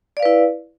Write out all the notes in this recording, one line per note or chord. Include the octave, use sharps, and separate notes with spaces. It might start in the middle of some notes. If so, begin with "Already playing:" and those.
E4 B4 D5 F5